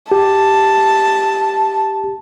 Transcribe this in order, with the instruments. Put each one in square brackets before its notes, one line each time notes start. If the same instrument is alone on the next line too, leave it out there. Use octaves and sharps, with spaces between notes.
[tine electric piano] G4 [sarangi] A5